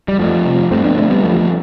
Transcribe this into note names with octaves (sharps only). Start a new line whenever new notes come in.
G3
F2 F3 A3
C3
G2 A3 C4
B3 D4
D3 A3 C4
G3 B3
E2 F3 A3